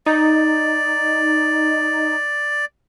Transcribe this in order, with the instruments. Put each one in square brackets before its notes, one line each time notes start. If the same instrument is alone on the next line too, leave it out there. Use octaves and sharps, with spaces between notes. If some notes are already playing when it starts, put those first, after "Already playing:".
[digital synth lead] D#4 [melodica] D5